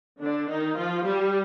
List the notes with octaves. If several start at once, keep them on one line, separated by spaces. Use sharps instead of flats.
D3 D4
D#3 D#4
F3 F4
G3 G4